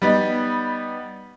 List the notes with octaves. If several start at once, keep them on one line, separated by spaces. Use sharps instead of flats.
G3 B3 D#4